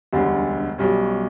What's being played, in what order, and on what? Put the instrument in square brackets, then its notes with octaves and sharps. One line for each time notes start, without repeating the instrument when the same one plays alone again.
[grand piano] E1 D2 D3 G3 C#4
B1 B2 G3 C#4